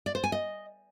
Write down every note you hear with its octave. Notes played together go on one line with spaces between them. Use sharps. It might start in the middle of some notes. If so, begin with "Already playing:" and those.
D5
C5
G#5
D#5